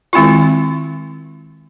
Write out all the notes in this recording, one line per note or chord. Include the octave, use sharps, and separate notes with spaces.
D#3 G#3 C4 E4 F4